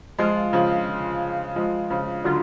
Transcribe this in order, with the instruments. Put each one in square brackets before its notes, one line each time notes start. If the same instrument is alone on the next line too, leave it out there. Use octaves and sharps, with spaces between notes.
[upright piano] F3 G#3 [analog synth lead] F4
[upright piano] C#3 F3
F3 G#3
C#3 F3
[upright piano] D3 F#3 [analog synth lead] F4